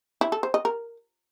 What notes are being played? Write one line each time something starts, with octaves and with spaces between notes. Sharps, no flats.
E4
A4
C5
D#5
A#4